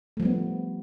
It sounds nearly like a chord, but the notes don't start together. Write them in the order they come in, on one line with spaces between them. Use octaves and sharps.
A3 F3 G3 B3